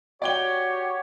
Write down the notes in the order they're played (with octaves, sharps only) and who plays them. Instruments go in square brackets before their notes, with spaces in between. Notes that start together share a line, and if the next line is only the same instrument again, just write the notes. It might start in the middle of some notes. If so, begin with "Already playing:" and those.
[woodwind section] F#4 G4 C#5 [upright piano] D5 G5 G7